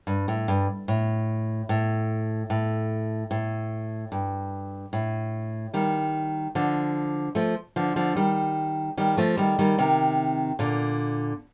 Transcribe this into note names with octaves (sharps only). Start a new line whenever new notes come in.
G2
A2
G2
A2
A2
A2
A2
G2
A2
D#3 G3
D3 F3
F3 A3
D3 F3
D3 F3
D#3 G3
D#3 G3
F3 A3
D#3 G3
D#3 G3
C3 D#3
A#2 D3